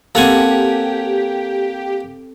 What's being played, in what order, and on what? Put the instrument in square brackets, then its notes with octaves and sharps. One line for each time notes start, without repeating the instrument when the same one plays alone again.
[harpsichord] A#3 F#5 G#5 [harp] C4 A4 [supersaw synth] G4